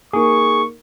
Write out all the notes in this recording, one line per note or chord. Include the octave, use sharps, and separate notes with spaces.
A#3 D#4 G#4 A#4 C#6